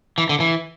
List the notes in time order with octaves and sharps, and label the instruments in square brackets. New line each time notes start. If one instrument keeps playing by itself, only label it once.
[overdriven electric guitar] E3
D3
E3